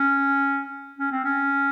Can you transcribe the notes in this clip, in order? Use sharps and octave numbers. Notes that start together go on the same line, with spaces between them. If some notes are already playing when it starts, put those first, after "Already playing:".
Already playing: C#4
C#4
C4
C#4